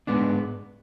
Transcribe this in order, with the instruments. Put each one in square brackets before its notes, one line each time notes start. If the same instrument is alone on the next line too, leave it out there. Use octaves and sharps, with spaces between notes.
[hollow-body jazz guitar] G#2 G#3 B3 D4